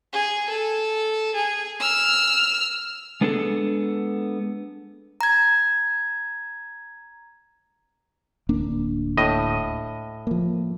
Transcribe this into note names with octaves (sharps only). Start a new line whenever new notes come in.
G#4
A4
G#4
E6 F6
G#3 B3 D4 G#4 A4
A#5 G#6
D1 A#3 D4
A2 D#5
F3 A#3